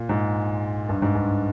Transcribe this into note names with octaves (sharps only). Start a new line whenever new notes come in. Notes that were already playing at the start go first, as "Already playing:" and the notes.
Already playing: A#2
G#2
G2
G#2
G2